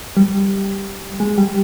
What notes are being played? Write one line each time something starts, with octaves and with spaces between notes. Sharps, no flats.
G3
G#3
G3